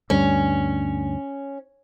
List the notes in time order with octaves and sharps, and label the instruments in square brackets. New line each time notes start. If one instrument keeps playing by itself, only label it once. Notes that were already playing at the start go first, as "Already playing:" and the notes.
[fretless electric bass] D2 G2 G3 [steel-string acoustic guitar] C#4